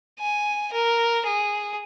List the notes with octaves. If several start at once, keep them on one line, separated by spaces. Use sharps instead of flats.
G#5
A#4
G#4